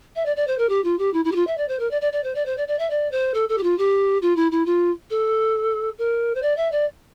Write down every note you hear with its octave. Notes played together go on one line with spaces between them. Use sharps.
E5
D5
D5
C5
A#4
G4
F4
G4
E4
E4
G4
F4
E5
D5
C5
A#4
D5
D5
D5
C5
D5
C5
D5
D5
E5
D5
C5
A4
A4
G4
F4
G4
F4
E4
E4
F4
A4
A#4
C5
D5
E5
D5